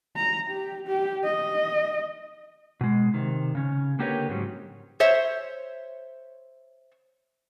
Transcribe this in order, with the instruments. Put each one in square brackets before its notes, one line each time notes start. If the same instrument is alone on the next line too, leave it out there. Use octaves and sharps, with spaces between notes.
[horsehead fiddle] A#5
G4
G4
D#5
[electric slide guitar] B2 G#3
C3 D#3
C#3 C#4
D3 A#3 G4 A#4 B4 C#5
G#2 C#3 F#3 G3
[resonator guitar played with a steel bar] C5 C#5 E5